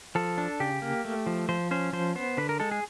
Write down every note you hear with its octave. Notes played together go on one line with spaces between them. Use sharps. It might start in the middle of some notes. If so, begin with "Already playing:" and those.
F3 A4
D4
C#3 G4
A#3
A3
F3
F3 C5
C#4 C5
F3 C5
B3 C5
D3 B4
A#4
G#3 A4
G#4